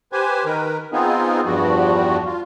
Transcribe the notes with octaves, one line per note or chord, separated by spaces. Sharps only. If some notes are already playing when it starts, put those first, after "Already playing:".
G4 B4 C5 G#5
D#3 A#4 B4
B3 C4 D#4 F4 G#4
E2 G2 F3 G3 F#4
F4